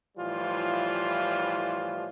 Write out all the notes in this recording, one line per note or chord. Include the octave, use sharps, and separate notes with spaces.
A2 E3 F3 G3 F4